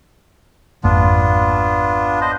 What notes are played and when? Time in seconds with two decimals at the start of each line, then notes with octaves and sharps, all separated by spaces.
0.84 G#1 F2 A#3 B3 D4 F4
2.21 C5 D#5